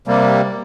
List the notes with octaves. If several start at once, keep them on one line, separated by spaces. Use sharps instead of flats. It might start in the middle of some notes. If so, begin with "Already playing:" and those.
C3 G3 A#3